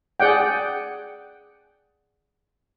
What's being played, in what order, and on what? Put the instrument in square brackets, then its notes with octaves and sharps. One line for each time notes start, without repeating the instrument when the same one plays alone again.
[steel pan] G#4 D5 F#5 G5